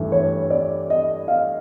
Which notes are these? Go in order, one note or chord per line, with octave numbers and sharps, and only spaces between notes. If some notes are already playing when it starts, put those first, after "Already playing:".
Already playing: G2 E3 A3
C#5
D5
D#5
F5